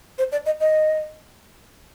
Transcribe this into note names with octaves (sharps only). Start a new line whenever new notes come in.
C5
D5
D#5
D#5